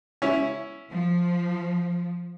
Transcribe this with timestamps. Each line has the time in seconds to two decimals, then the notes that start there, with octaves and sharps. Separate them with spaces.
0.22 C#4 E4
0.91 F3